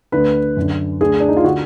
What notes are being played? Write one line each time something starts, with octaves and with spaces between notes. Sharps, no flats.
D2 D3 B4
F#2 D3
D2 D3 G#4
D4
D#4
F4
D3 F#4